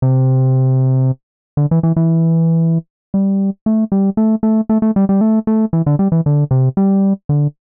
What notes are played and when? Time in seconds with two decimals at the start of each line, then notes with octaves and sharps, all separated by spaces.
0.02 C3
1.57 D3
1.71 E3
1.83 E3
1.96 E3
3.14 G3
3.66 A3
3.92 G3
4.17 A3
4.43 A3
4.69 A3
4.82 A3
4.96 G3
5.09 G3
5.21 A3
5.47 A3
5.73 E3
5.86 D3
5.99 G3
6.12 E3
6.26 D3
6.51 C3
6.77 G3
7.29 D3